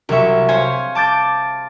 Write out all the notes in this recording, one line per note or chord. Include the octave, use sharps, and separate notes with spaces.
C2 F#3 G3 E5 C#6
C5 C#5 F5 G#5
A5 D6 G6 A6